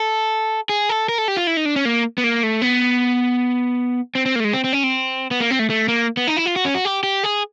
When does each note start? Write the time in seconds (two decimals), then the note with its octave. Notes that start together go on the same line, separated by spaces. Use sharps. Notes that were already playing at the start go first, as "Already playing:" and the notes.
Already playing: A4
0.69 G#4
0.89 A4
1.09 A#4
1.18 A4
1.28 G4
1.37 F4
1.47 E4
1.57 D#4
1.65 D4
1.76 C#4
1.85 A#3
2.18 B3
2.24 A#3
2.43 A3
2.62 B3
4.15 C4
4.26 C4
4.35 A#3
4.40 A3
4.44 G#3
4.54 C4
4.64 C4
4.73 C#4
4.84 C4
5.31 B3
5.40 A#3
5.51 C4
5.59 A3
5.70 A3
5.88 A#3
6.17 B3
6.28 D#4
6.37 E4
6.46 F4
6.56 F#4
6.65 C#4
6.75 F#4
6.85 G4
7.03 G4
7.24 G#4